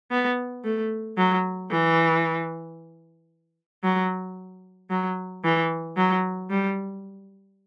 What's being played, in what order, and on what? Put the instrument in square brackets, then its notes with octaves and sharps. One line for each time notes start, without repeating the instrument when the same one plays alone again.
[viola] B3
A3
F#3
E3
F#3
F#3
E3
F#3
G3